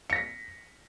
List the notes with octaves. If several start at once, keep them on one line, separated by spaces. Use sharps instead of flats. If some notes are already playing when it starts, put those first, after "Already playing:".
A#6 B6 C#7